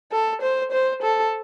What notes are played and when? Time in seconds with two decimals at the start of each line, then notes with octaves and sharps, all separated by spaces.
0.12 A4
0.42 C5
0.72 C5
1.03 A4